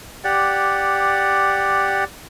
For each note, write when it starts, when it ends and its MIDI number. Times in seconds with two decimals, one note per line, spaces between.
0.24 2.04 67
0.24 2.04 74
0.24 2.04 78